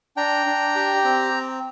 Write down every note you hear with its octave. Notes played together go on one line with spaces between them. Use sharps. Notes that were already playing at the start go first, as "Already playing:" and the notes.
D4 G5 A#5
D4
G4
C4